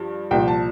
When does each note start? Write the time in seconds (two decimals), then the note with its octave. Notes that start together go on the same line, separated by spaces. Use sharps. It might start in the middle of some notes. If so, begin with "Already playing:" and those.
Already playing: G2 F3
0.31 C2 A#2 F3 G5
0.48 A5